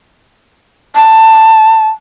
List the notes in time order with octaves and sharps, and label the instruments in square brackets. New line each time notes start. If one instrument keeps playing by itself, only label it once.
[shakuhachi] A5